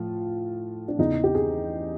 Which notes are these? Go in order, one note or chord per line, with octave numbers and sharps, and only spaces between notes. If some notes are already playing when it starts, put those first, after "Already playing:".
Already playing: A2 F3 F4
D4
E2 C#3 E3 D#4
G4
G#4